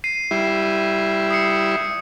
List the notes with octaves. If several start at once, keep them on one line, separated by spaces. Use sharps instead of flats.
C7 D#7
G3 E4
D#6 C7 C#7